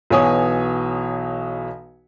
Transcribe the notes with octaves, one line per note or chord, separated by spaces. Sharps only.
B1 B2 E3 C#5 G#5 D#6